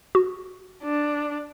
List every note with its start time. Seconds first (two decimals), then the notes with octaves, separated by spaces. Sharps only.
0.15 F#4
0.83 D4